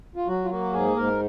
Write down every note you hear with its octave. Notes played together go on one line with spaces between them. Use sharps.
F4
F#3 F#4
F4
A#3 F#4
G#2 G#4
G#2 A#4